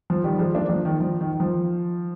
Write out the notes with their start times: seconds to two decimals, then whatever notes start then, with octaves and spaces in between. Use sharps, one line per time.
0.10 F3
0.24 D#3 G3
0.39 F3 G#3
0.55 A#3 D4
0.69 F3
0.85 D#3
1.00 F3
1.21 D#3
1.33 D#3
1.40 F3